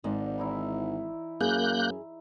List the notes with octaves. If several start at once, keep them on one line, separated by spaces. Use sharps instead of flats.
G#1 G#2 C5 D5 D#5
E3 D#4 E4
F#2 A#3 G#4 F#6 G6